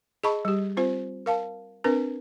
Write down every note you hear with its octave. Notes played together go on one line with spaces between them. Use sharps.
G#4 D#5 A5 B5 C#6
G3 G4
C4 F4 C5
A#4 F5 A5
C4 D4 A#4 B4